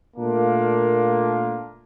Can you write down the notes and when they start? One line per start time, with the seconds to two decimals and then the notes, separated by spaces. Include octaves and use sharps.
0.17 A#2 A3 A#3 D4 F4